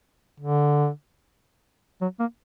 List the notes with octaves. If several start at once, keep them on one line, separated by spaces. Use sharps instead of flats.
D3
F#3
A#3